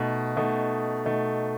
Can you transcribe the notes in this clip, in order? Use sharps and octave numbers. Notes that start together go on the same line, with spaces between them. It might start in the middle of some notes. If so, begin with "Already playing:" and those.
Already playing: B2 A3 D#4
B2 A3 D#4
B2 A3 D#4